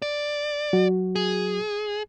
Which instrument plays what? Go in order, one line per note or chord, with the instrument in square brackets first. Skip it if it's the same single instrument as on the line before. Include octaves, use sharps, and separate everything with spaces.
[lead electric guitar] D5
[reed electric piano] F#3 F#4
[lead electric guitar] G#4